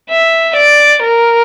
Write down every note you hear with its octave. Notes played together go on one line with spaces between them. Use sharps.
E5
D5
A#4